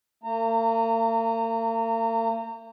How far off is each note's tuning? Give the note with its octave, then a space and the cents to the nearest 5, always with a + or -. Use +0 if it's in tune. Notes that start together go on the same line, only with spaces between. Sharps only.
A#3 -45 A#5 -30